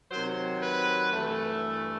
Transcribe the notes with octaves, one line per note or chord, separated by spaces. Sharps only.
C3 D#3 F#3 C5
B4
G2 E3 A3